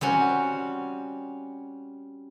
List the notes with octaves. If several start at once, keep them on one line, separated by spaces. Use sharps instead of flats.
G3 C4 C#4 F#4